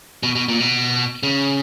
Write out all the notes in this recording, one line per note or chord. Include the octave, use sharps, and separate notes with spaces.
B2
B2
A#2
B2
C#3